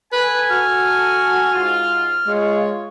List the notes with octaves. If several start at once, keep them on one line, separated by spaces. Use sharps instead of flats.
A4 B4 G#5
F#4 F6
G#2 F4
G#3 F4 C#5